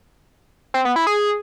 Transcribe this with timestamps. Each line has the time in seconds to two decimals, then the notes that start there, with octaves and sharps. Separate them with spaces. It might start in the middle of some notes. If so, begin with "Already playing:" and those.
0.74 C4
0.85 B3
0.96 E4
1.07 G#4